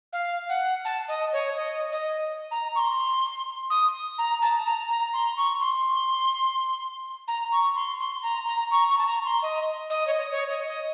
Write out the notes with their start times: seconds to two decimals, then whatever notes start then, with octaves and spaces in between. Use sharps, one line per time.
0.12 F5
0.49 F#5
0.84 A5
1.08 D#5
1.32 C#5
1.55 D#5
1.92 D#5
2.51 A#5
2.75 C#6
2.79 C6
3.70 D#6
4.18 A#5
4.42 A5
4.66 A#5
4.89 A#5
5.13 C6
5.37 C#6
5.60 C6
7.27 A#5
7.52 C#6
7.75 C6
7.99 C6
8.22 A#5
8.47 A#5
8.71 C#6
8.88 C#6
8.98 A5
9.06 A#5
9.25 C6
9.42 D#5
9.90 D#5
10.07 C#5
10.13 D#5
10.31 C#5
10.49 D#5
10.67 D#5